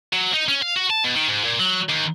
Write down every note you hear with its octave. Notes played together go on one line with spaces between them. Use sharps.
F#3
D#4
C#4
F5
F#4
A5
B2
D#3
G#2
A#2
F#3
D#2